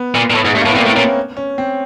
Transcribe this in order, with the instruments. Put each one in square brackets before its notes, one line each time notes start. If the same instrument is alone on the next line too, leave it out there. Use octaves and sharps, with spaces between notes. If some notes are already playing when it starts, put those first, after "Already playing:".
Already playing: [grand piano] B3
[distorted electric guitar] A#2
A#2
A2
G#2
[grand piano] A3
[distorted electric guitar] G2
[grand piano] A#3
[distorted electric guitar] A2 [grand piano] B3
[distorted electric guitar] A#2 [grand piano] C4
[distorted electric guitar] A2
[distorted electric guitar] A#2 [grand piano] C#4
[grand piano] C#4
C4